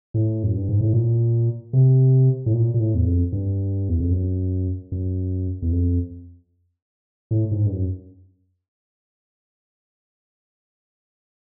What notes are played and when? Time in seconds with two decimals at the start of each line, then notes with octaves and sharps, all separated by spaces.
0.14 A2
0.43 F#2
0.56 G2
0.69 G#2
0.81 A2
0.93 A#2
1.73 C3
2.46 A2
2.53 A#2
2.74 A#2
2.80 A2
2.95 E2
3.06 F2
3.32 G2
3.89 E2
4.00 F2
4.12 F#2
4.92 F#2
5.62 E2
5.71 F2
7.31 A2
7.51 G#2
7.66 G2
7.71 F#2